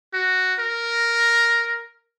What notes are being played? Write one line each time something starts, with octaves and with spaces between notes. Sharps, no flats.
F#4
A#4